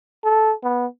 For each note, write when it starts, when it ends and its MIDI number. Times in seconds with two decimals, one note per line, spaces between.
0.24 0.53 69
0.63 0.86 59